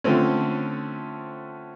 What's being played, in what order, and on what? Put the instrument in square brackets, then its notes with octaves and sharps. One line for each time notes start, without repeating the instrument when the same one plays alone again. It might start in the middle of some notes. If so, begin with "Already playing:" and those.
[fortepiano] D3 F3 A3 C4 C#4